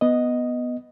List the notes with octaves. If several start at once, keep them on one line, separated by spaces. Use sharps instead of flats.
B3 D#5